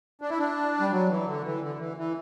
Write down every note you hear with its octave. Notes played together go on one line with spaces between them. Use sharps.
D4
E4
D4
G3
F#3
E3
D3
E3
D3
E3
E3